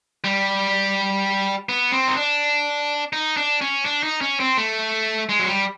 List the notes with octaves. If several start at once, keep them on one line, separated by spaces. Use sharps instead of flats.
G3
B3
C4
D#4
D4
D#4
D4
C#4
D4
D#4
C#4
C4
A3
G#3
F#3
G3